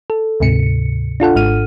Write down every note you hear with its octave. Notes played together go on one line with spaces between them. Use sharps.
A4
D2 G#2 C3 C#7
D4 F4 A4 F#5
G#1 G#2 F6 D#7